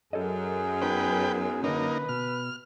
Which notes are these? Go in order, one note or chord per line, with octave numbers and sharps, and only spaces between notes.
F#2 G#4 A4 C#5 D#5
B3 D#4 B4 C5 G5
D3 A#3 C#4 D#4 B4
B2 F6